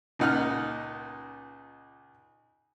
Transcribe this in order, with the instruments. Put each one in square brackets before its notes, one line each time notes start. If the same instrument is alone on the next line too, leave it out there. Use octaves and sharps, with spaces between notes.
[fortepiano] C#2 A#2 D#4 F#5 F6 F#6